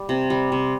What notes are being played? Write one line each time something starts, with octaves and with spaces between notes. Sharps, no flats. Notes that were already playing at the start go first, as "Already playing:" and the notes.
Already playing: G3
C3
G3
C3